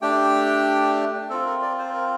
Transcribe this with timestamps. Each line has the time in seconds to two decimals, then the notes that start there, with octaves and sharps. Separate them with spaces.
0.02 A3 D4 G4 G5
1.30 C4 F4 A4
1.46 A#4
1.62 D5
1.79 C5
1.94 A#4